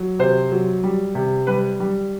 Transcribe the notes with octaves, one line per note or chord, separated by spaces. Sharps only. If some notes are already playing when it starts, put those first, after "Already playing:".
Already playing: F#3
C3 C5
F#3
G3
C3
G3 B4
G3